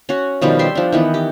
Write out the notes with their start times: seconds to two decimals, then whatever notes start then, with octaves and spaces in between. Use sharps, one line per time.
0.09 C#4 F#4
0.42 B2 D#3 F3 G3
0.59 E5 G5 C6
0.75 F3 D4
0.92 D#3 E3 B3
1.14 G4